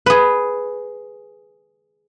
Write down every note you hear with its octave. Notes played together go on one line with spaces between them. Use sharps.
G#4 B4